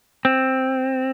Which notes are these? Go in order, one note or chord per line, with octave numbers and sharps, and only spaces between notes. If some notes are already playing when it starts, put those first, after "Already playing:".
C4